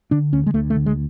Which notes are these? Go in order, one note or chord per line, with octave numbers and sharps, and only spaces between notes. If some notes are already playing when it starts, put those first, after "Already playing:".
D3 D4
D2 C#4
G#3
D2 A3
A3
D3
G#3